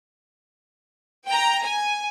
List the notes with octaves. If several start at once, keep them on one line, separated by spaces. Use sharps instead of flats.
G5 A#5
G#5